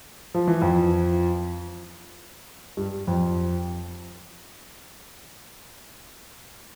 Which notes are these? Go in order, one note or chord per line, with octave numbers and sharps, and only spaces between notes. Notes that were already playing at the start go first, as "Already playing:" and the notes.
F3
E3
F2 F3
G2 G3
F2 F3